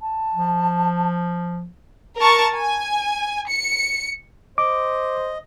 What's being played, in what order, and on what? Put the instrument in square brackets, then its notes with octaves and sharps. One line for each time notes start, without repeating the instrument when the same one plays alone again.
[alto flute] A5
[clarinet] F3
[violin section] A#4 A5 C#6
G#5
C#7
[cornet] C5 [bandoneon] D#5 [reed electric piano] D6